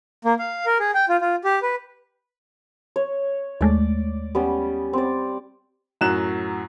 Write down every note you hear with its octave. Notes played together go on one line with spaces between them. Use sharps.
A#3
F5
A#4
G#4
G5
F4
F4
G4
B4
C#5
D#2 G#3 A3 D5
G3 B3 C#4
C4 D5
F#2 A2 F#3 F#6 E7